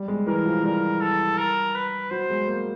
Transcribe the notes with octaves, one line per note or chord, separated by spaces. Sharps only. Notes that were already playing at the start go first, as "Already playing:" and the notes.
Already playing: G3
G#3
E3 A#4
F3
G3 A#4
A4
A#4
B4
F#3 C5
G#3
A#3